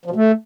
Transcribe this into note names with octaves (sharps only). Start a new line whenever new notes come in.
F3
B2
A3